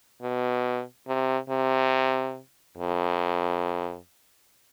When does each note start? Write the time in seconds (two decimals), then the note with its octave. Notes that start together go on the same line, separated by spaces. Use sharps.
0.22 B2
1.08 C3
1.49 C3
2.77 F2